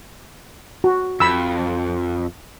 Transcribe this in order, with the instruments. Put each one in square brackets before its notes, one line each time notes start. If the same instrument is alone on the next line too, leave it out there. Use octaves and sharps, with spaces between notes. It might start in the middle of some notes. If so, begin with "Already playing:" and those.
[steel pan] F#4
[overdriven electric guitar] F2 [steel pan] B5 E6